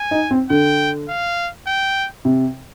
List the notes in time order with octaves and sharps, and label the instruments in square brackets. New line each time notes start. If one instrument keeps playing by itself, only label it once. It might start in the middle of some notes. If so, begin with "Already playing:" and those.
Already playing: [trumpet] G#5
[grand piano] D#4
C4
[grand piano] D3 [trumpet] G5
[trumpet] F5
G5
[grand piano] C3